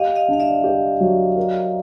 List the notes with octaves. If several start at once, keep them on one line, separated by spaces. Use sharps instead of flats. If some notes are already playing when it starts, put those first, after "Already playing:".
Already playing: G4 D#5 F5
D#5 F5
D4 F5
D5 E5
G4
F#3
A#4